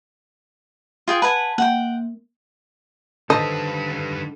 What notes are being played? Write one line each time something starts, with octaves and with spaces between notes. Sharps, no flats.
F4 G#4 G5
B4 F#5 G#5 A5
A#3 F#5 G5
D3 D#3 G3 A4 B4 C5 D#5